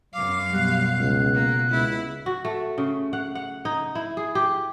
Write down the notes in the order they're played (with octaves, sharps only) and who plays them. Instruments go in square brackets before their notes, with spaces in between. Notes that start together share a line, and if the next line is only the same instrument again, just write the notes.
[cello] F#2 F5 [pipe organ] F#3 D6
[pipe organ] B2 B3 F#6 [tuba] G3
[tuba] C#2
[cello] A#3
[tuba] C#2 [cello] E4
[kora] F#4
A3
C#3
F#5
F#5
D#4
E4
G#4
G4